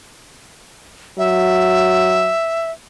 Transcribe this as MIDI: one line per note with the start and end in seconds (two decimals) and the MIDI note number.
1.18 2.33 54
1.18 2.71 76